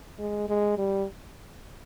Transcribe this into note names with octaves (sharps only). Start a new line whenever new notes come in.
G#3
G#3
G3